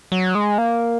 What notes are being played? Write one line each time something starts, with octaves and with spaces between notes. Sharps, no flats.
F#3
G#3
A#3